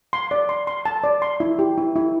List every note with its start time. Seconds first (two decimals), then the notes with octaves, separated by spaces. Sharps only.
0.13 C6
0.31 D5
0.49 C6
0.67 C6
0.86 A5
1.04 D5
1.22 C6
1.40 E4
1.59 G4
1.78 E4
1.96 E4